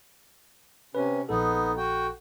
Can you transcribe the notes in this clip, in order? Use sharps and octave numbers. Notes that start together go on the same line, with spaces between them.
C3 C#4 B4
A#1 B3 D#4 A4
F#4 G5